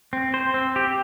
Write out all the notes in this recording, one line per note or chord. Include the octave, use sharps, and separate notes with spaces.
C4
C5
C4
G4